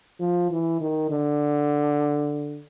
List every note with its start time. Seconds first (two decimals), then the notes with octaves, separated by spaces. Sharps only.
0.20 F3
0.51 E3
0.81 D#3
1.10 D3